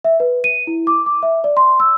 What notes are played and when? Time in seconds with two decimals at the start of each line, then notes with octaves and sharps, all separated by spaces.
0.05 E5
0.20 B4
0.44 D#7
0.67 E4
0.87 D6
1.06 D6
1.23 E5
1.44 D5
1.57 C6
1.80 E6